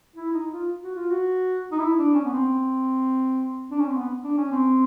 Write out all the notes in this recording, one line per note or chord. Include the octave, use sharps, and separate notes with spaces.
E4
D#4
F4
F#4
F4
F#4
D#4
E4
D4
C#4
B3
C4
D4
C#4
C4
B3
D4
C#4
C4